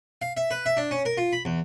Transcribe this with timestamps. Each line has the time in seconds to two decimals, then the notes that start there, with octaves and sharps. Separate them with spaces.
0.22 F5
0.37 E5
0.51 B4
0.66 E5
0.77 D4
0.91 C#4
1.05 A#4
1.17 F4
1.33 B5
1.45 E2